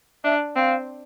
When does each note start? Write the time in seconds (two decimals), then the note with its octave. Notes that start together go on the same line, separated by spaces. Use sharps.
0.24 D4 E5
0.56 C4 F5